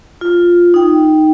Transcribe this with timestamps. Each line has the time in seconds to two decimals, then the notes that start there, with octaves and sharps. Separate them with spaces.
0.21 F4
0.74 D#4 G5